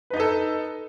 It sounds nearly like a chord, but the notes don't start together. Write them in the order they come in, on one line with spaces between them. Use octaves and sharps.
B4 D#4 D#5 A4